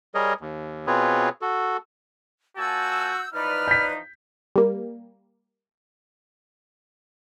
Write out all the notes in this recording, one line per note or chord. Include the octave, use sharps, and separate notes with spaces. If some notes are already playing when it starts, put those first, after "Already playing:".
G3 G#4 A#4 C#5 D#5
D#2
B2 C4 F4 G#4 B4 C#5
F#4 A4
A#2 F#4 G#5 A5 E6 G6
E3 F3 D#4 B4 D5 F6
G6 B6
G3 A#3